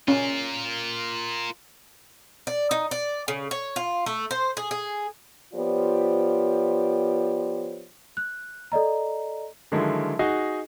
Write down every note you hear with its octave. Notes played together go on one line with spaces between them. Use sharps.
C#4 F4 A#4
D5
D#4
D5
C#3
C#5
F4
A3
C5
G#4
G#4
F3 B3 F4 G4 C#5 D5
F#6
A4 D5 D#5 A#5
D3 D#3 F3 F#3 G#3 E4
D#4 F#4 G#4 D#5